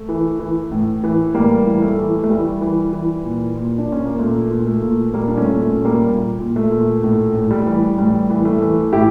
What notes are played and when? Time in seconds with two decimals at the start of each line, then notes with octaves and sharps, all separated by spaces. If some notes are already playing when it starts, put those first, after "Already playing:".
Already playing: A3
0.09 E3
0.40 E3
0.71 A2
1.04 E3
1.34 A2 G3 A#3
1.66 E3
1.82 A3
1.98 E3
2.24 A3
2.29 E3 G3
2.61 E3
2.93 E3
3.24 A#2
3.56 A#2
3.78 D4
3.87 A#2 C#4
4.05 A#3
4.19 A#2 A3
4.51 A#2
4.67 A3
4.82 A#2
5.14 A#2 G3 A#3
5.28 D4
5.37 A3 C#4
5.45 A#2
5.61 A3 C#4
5.77 A#2
5.85 G3 A#3
6.09 A#2
6.40 A#2
6.56 A3
6.71 A#2
7.03 A2 A3
7.35 A2
7.51 G3
7.66 E3
7.98 A2 G3
8.30 E3
8.45 A3
8.62 E3
8.93 A2 E4 G4